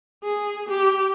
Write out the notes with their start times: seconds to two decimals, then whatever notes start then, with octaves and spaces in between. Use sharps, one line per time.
0.24 G#4
0.69 G4